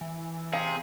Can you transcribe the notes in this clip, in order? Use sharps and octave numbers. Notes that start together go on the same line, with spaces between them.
E3
C3 G#4 F5